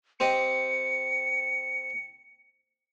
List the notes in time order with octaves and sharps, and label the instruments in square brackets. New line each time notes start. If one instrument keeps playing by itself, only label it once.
[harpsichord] C4 G4 D#5 [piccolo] C#7